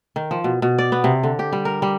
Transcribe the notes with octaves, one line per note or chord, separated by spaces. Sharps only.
D#3
F3
B2
B2
D5
B3
C3
D3
G4
G3
A#4
G3